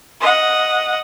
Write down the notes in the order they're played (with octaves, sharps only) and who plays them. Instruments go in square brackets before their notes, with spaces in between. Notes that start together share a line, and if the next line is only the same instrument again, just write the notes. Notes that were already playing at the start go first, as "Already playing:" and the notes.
[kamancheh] D#5 F#5